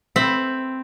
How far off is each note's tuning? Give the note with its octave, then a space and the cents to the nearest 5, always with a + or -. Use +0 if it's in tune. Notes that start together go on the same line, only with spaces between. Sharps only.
C4 +0 E5 +0 B5 +0